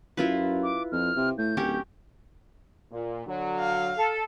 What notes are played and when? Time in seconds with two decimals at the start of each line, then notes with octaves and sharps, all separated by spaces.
0.17 F#2 E4 F4 B4
0.63 D6
0.92 F2 F6
1.16 C3
1.38 A2 G6
1.57 D1 C#4 G4 A#4
2.92 A#2
3.27 D3 F#3
3.60 F5
3.95 A4